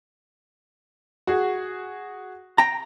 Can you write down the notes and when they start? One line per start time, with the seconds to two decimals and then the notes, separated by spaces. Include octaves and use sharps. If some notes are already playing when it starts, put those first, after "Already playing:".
1.27 F#4 G#4
2.58 G5 A#5